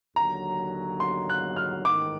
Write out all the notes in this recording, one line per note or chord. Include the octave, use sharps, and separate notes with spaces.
D#2 D3 F#3 A#5
C6
F#6
F6
A1 G#2 D#3 D6